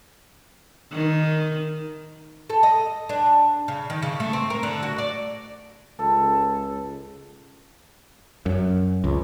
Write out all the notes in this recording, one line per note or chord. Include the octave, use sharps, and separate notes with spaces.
D#3
A4
D#5
D4
C#3
D#3
C#3
A3
C4
A#4
D3
F#4
D5
C#2 A4
F#2
C#2